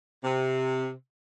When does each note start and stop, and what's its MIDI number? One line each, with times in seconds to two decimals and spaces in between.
0.24 0.92 48